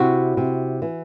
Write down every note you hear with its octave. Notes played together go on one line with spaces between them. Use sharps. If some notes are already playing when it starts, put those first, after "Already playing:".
Already playing: C3 E4 F#4
C3
E3